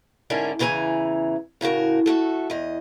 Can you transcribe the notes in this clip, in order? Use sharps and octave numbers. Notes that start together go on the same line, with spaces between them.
G#2 D3 C#4 D4 E4 A#4
E2 C#3 E3 G#4 G#5 A#5
A2 C#3 F#4 A#4
A3 F#4 A4
E2 D#5